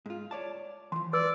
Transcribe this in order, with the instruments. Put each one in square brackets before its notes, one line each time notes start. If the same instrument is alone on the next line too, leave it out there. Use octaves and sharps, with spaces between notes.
[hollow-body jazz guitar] G#2 F4
C#5 D5 A5
[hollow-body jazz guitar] E3 F3 [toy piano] C6
[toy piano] B4 E6 [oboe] D5